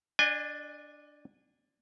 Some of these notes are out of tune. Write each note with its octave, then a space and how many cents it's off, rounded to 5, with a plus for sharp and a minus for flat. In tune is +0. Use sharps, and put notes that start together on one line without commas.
D4 +0 D#5 -40 G#5 -25